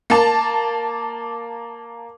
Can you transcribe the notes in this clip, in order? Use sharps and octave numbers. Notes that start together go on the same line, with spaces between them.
A#3 A5